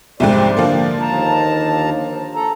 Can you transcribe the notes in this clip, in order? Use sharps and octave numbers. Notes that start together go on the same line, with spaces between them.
C2 F2 G#2 C5 D5
D3 F3 A#3
D#2 A5 A#5
A4 A#5